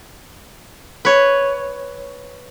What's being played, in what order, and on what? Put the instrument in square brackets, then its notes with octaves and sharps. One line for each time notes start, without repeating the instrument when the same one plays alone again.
[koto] B4 C#5